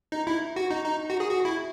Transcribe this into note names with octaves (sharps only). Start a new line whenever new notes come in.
D#4
E4
F#4
D#4
D#4
F#4
G#4
F#4
E4